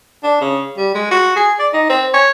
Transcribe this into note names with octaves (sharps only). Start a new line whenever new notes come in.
D4
C#3
G3
G#3
F#4
G#4
D5
D#4
C4
C#5